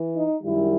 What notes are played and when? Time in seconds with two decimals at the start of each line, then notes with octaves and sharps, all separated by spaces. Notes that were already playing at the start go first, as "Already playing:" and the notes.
Already playing: E3
0.13 D#4
0.42 F#2 D#3 G3 E4